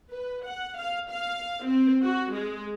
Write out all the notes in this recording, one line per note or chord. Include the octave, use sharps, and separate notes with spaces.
B4
F#5
F5
F5
C4
F#4
G#3